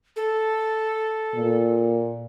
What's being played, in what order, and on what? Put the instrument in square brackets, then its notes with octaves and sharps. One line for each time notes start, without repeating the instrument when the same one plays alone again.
[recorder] A4
[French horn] A#2